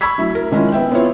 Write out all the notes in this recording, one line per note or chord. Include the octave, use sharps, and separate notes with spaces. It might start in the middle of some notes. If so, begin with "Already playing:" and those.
B5 C#6 E6 G#6 B6
F#3 A3 E4 E5
A#4
D#3 G#3 C#4 E4 F4 C#5
B3 E5 G5
B3 C4 E4 F4 C#5